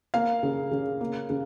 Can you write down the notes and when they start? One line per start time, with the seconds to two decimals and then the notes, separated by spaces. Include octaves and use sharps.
0.14 A#3 F5
0.43 C#3
0.71 C#3
1.01 A#3
1.30 C#3